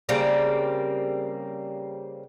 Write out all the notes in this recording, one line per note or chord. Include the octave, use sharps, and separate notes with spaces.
C#3 G3 A#3 C4